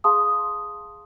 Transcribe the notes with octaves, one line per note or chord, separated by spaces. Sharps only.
G#4 F5 A5 C6 D#6